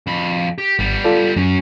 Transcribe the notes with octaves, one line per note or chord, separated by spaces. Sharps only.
F2 B5
G4
G#1 G3 B3
F4 A4 D5
F#2 F#3 C#4